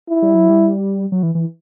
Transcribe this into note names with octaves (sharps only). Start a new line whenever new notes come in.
E4
G3
F#3
G3
F#3
E3
E3